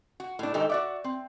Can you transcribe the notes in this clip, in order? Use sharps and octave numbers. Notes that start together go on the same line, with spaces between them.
F#4
A2 D4
G#2 D#3 D#4 G4 A4
F#4 D5 E5
C4